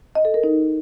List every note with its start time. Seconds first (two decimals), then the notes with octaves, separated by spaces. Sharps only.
0.15 D#5
0.25 A4
0.34 A#4
0.44 D#4